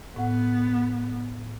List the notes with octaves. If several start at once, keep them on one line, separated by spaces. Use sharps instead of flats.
A2 B3 F#5